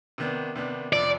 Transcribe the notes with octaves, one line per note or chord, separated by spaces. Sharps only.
C3 D#3 B3 D4
C3 D#3 B3 D4
F2 C3 F3 C4 D5